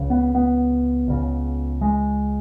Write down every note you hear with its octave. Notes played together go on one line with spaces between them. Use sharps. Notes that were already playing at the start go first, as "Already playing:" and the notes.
Already playing: C#2 C#3
B3
B3
C#2 C#3
G#3